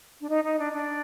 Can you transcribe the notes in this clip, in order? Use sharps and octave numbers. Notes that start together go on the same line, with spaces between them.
D4
D#4
D#4
D4
D4